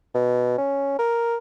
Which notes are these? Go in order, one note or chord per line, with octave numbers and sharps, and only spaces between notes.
B2
C#4
A#4